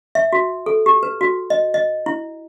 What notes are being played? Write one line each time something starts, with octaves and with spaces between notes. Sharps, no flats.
E5
F#4
A4
G4
B4
F#4
D#5
D#5
E4